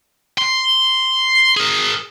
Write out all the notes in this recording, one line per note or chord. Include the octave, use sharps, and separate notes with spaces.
C6
G#4 A#4